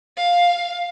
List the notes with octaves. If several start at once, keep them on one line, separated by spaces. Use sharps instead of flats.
F5